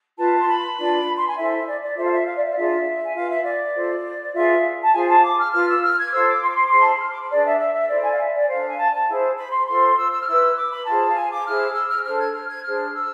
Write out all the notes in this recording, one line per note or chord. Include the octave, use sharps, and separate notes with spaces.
F4 B4 A5
C6
B5
D4 F4 B4
C6
G#5
E4 A4 C5 E5
D5
D5
F4 A4 C5 E5
F5
E5
F5
D5
E5
D5
D4 F4 G#4 E5
G#5
F4 B4 F5
E5
D5
F4 A4 C5
F4 G#4 B4 E5
A5
F4 G#4 C5 G#5
A5
D6
F6
F4 B4 F6
E6
F6
G#6
D6
F4 A4 C5 E6
D6
C6
D6
C6
D6
E4 G#4 C5 C6
A5
B5
F6
D6
B5
D4 G#4 B4 D5
E5
E5
E5
E4 A4 C5 D5
G#5
F5
E5
D5
D4 A4 C5 F5
G#5
A5
A5
E4 G#4 C5
B5
C6
F4 A4 C5 C6
E6
E6
F6
E4 B4 E6
D6
B5
F4 G#4 C5 A5
F5
G#5
D6
E4 G#4 C5 F6
E6
F6
D4 A4 C5 F6
G#6
F6
G#6
D4 G#4 C5 F6
E6